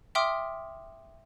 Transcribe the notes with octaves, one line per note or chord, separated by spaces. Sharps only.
E5 G5 C6 D6 D#6 F6